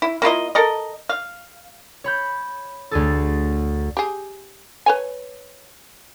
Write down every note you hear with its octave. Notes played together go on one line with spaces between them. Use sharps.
E4
A#3 E4 F4 D#5
A4 A#4 D#5
F5
C#5 B5 G6
D2 G#4 A4
G4 G#4
B4 C#5 G#5